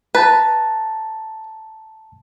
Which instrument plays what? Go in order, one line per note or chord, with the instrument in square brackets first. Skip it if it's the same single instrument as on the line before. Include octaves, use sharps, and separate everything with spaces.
[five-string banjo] B4 [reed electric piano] A5 A#5